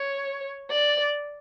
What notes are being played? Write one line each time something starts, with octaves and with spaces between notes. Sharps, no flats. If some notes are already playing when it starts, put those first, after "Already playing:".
Already playing: C#5
D5